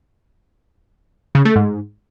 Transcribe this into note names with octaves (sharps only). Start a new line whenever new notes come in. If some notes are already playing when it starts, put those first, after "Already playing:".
C#3
A3
G#2